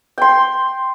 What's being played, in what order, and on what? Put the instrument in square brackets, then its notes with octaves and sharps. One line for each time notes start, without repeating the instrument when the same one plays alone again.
[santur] G5 C6